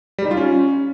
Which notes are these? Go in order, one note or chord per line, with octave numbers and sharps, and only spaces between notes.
G3
D#4
F4
C#4